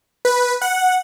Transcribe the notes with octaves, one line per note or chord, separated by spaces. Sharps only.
B4
F#5